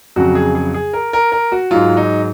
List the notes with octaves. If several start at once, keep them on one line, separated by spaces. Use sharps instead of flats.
F2 C#3 F#3 F#4
G#4
G#4
G#4
A#4
A#4
A#4
F#4
G#2 F#3 F4
D#4